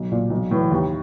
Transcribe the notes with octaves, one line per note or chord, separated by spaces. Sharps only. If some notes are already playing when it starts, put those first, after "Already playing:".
Already playing: B1
A#2
B1
A2 E3
D#2